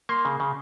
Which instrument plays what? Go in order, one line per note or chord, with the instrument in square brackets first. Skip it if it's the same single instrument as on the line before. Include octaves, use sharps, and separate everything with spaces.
[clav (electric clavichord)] A#3 [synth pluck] C6
[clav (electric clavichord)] C#3
C#3